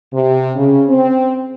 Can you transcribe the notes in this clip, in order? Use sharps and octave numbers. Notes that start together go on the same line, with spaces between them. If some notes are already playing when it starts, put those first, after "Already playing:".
C3
C#3
C4